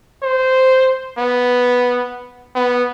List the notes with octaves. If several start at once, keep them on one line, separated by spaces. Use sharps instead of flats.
C5
B3
B3